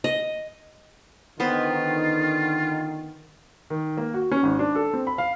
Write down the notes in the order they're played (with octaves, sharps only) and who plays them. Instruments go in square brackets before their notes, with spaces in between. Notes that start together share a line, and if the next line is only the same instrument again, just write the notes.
[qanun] D#5
[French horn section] D3 D#3 [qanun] B3 B4 C5 [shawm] F4
[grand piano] D#3
A#3
F#4
C#4
G#1
D4
A4
C4
B5
F5